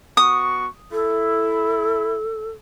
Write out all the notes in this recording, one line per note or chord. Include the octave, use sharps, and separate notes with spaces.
B3 F#4 C#6 D#6
E4 A4